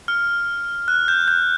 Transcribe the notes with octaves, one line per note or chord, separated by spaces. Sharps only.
F6
F#6
G6
G6